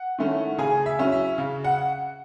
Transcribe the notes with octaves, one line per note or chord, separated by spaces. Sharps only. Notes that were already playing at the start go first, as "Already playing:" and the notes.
Already playing: F#5
D#3 A3 C#4 E4
C#3 G#4 G#5
E5
F#3 C#4 E4
E5
C#3
F#5